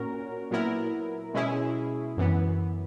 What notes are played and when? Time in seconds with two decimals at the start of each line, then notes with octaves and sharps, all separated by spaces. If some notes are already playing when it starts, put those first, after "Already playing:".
Already playing: A#2 C#4 F#4 A#4
0.51 A#2 F#3 B3 E4 A#4
1.34 B2 G#3 C#4 E4 G#4
2.17 F#2 E3 B3